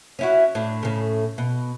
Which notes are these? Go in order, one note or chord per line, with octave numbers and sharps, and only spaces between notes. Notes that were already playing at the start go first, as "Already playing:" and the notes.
C#4 E4 F#4
A2 D4
A2 C#3
B2